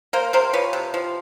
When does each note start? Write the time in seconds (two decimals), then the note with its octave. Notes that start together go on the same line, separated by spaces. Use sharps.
0.13 A#3 A#4 C5
0.33 C3 A#4 C5
0.53 F3 B4 C#5
0.73 C3
0.94 F3